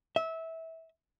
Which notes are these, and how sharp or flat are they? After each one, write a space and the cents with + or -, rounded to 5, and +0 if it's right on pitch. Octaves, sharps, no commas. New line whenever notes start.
E5 -20